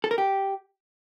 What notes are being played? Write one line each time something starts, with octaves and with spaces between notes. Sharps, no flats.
A4
A#4
G4